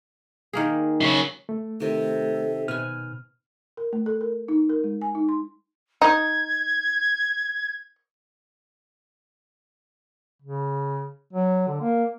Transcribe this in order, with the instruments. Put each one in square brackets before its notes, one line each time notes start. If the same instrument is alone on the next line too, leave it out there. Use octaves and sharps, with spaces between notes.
[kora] D#3 A#3 G#4
[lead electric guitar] C#3 F#3
[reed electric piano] A3
[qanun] C3 D#3 [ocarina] A4
[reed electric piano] B2 F6 [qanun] B4 G#5
[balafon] A#4
A3
A4
A#4
D#4
A#4
G#3
G#5
D#4
C6
[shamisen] D#4 [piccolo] G#6
[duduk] C#3
F#3
D3
A#3